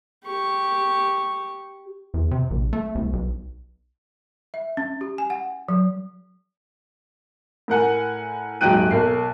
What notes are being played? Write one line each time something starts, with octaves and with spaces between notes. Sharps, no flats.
G4 C#6
E2
C3
A#1
A3
C2
B1
E5
C#4
G4
G#5
F#5
F#3
A2 A#4 F#5 G#5
D#1 G#2 F#3 G5 F#6 D#7
B1 A#4 C7